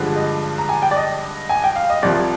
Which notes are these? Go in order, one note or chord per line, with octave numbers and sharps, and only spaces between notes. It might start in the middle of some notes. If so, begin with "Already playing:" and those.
Already playing: G2 D3 F3 G#3
D#5
A#5
G#5
G5
D5
D#5
G#5
G5
F5
D#5
C2 C3 F3 D5